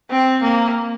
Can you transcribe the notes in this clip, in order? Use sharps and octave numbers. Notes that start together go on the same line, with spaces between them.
C4
A#3